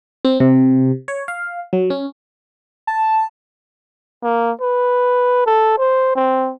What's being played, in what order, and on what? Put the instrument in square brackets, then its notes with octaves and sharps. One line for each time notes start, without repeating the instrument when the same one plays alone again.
[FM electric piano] C4
C3
C#5
F5
F#3
C#4
[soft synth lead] A5
[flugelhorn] A#3
B4
A4
C5
C4